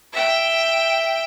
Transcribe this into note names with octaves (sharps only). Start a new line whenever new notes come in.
E5 G5